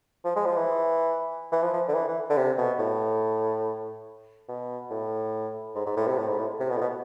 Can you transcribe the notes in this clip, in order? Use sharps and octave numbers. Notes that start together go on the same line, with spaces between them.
F3
G#3
F3
E3
E3
F3
F3
D3
E3
E3
D3
C3
B2
A2
B2
A2
G#2
G#2
A2
C3
A2
G#2
A2
C3
B2
A2
B2